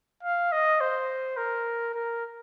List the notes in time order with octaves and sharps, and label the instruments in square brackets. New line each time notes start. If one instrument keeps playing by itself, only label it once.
[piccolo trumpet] F5
D#5
C5
A#4
A#4